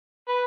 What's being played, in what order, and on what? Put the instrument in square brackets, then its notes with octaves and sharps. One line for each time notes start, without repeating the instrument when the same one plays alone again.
[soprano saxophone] B4